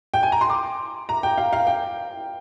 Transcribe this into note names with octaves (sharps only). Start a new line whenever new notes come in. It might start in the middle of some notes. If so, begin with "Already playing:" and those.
G5
G#5
A#5
C6
D6
A#5
G5
F5
F5
G5